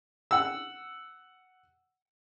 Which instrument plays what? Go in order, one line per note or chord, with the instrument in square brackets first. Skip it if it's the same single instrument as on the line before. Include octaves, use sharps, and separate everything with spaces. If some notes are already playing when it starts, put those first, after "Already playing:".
[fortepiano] F#5 E6